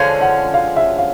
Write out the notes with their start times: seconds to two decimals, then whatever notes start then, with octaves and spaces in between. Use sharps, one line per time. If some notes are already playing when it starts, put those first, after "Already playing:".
Already playing: D3 F3 G#3 C#4 F5
0.21 F#5
0.54 F5
0.76 E5
0.98 F5